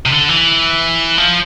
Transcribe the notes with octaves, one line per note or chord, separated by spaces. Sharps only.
C3
D3
E3
F3